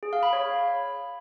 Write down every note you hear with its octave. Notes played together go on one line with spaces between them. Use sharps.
G#4
F5
B5
C#5